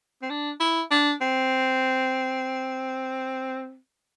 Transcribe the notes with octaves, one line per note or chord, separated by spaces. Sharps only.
C4
D4
E4
D4
C4